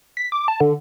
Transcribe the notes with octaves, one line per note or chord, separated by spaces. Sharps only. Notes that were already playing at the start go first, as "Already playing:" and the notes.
B6
D6
A5
D3